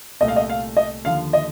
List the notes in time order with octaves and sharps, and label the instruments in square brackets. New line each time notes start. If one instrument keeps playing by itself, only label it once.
[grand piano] C2 A#2 A3 D#5
F5
D#5
F5
D#5
D#2 D3 F3 F5
D#5